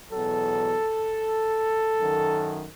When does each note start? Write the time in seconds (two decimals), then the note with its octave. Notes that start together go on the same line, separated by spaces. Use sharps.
0.12 E2 B2 F#3 A4
2.01 F#2 D#3 F#3